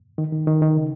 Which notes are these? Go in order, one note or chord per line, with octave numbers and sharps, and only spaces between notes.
D#3
D#3
D#3
D#3
C#3